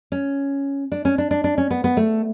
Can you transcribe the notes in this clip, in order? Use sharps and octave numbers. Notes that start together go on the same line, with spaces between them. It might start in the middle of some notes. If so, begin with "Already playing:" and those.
C#4
D4
C#4
D4
D4
D4
C#4
B3
B3
A3